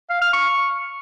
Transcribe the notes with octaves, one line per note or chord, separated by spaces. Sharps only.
F5
F6
C#6